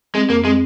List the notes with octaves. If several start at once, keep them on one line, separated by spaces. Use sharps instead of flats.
G#3 C4
F2 A#3
G#3 C4